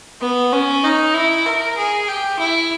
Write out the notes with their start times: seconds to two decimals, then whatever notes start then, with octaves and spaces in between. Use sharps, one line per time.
0.22 B3
0.52 C#4
0.84 D#4
1.14 E4
1.46 A#4
1.77 G#4
2.09 G4
2.39 E4